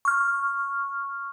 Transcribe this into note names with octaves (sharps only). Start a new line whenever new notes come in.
C#6 F6